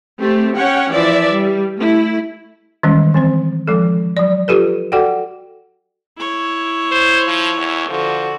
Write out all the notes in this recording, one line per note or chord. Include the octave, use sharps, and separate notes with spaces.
A3 C4 G4
C#4 C#5 F#5 G5
E3 F3 D5 E5
G3
A3 E4
D#3 E3 G3 G#3 C#4
E3 C4 C5
F3 G#3 A4
F#3 D5
F4 G4 A4 B4
F#4 A4 D5 F#5 G5
E4 C#5
C5
F3
E2
D3 F3 F#4